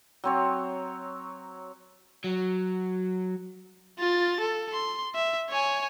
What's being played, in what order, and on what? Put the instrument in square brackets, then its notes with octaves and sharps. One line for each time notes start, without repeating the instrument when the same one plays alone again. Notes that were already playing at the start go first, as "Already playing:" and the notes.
[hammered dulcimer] F#3 C4 C#5
[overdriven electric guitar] F#3
[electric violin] F4 A6
A4
C6
E5
C#5 G#5